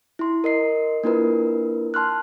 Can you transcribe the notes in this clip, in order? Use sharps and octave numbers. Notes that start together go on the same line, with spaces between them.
E4 C6
A#4 D#5 C7
A#3 D4 E4 F4 A#4 B4
A5 C6 F6 F#6